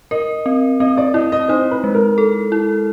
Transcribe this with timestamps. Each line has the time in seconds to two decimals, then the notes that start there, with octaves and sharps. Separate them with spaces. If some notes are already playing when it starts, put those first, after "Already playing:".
0.11 A#4 D#5
0.46 C4
0.80 C4 D#5
0.97 D5
1.14 E4 D#5
1.32 D#5
1.48 D#4 C5
1.71 B4
1.84 G#3
1.94 A#4
2.18 A4
2.52 E4